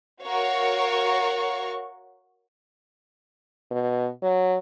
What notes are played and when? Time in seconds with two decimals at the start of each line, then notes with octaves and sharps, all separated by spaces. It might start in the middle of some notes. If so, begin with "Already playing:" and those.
0.24 F#4 A#4 C#5 F5 C#6
3.71 B2
4.22 F#3